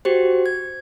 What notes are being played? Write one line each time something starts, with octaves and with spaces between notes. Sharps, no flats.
F#4 G4 C5
G#6